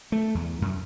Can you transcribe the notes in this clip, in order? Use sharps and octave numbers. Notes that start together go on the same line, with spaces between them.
A3
E2
F#2